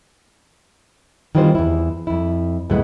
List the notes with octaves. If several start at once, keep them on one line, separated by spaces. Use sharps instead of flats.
D#3 E3 G3 C4 F4 C5
E2 E4
F2 E4
D2 A2 G#3 B3